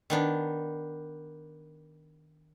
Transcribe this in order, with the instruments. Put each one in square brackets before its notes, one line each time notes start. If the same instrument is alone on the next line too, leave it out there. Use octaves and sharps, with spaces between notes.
[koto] D#3 B3 D4